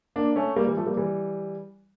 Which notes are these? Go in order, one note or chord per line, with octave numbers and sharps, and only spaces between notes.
A#3 D4
A3 C#4
G3 A#3
E3 G3
F3 A3
G3 A#3
E3 G3